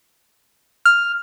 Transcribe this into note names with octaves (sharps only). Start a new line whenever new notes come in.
F6